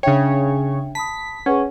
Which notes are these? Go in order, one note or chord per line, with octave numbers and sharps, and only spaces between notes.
C#3 D4 C#5 E5 G5
A5 B5 D#6 B6
C#4 G#4 B4 F#5